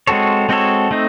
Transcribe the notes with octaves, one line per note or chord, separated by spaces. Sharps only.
G#3 C4 F#4 A4 C#5
G#3 C4 F#4 A4 C#5
A3 C4 D#4